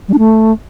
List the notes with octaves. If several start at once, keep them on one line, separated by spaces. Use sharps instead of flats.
G3
D4
A3